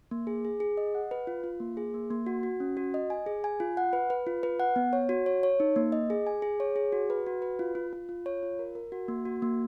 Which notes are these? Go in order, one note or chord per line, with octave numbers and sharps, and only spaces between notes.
A#3
G#4
G#4
G#4
D#5
F#5
B4
F4
F4
A#3
G#4
A#3
A#3
F#4
F#4
C#4
F#4
D#5
G#5
G#4
G#5
F4
F#5
B4
B4
F4
B4
F#5
B3
C#5
F#4
C#5
C#5
D#4
A#3
D#5
G#4
G#5
G#4
C#5
G#4
F#4
B4
F#4
B4
F4
F4
F4
F4
C#5
F4
A#4
A#4
F#4
A#3
F#4
A#3